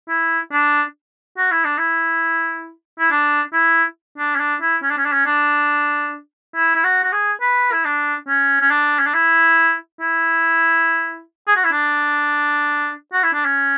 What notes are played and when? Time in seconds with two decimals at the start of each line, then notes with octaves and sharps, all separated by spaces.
0.09 E4
0.52 D4
1.37 F#4
1.51 E4
1.65 D4
1.78 E4
2.99 E4
3.11 D4
3.53 E4
4.18 D4
4.35 C#4
4.39 D4
4.61 E4
4.82 C#4
4.90 D4
4.97 C#4
5.05 D4
5.12 C#4
5.25 D4
6.55 E4
6.75 E4
6.84 F#4
7.03 F#4
7.12 G#4
7.41 B4
7.72 E4
7.84 D4
8.28 C#4
8.60 C#4
8.70 D4
8.99 C#4
9.06 D4
9.13 E4
10.00 E4
11.47 G#4
11.56 F#4
11.64 E4
11.72 D4
13.13 F#4
13.23 E4
13.33 D4
13.45 C#4